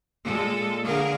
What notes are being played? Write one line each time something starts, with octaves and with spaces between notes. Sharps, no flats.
A#2 G#3 A4
D3 G#4 A#4 F5